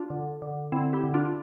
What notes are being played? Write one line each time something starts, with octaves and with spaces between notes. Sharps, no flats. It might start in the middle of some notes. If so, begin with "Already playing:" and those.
Already playing: D4 F4
D3
D3
D3 C4 E4
E4 G4
D3
D4 F4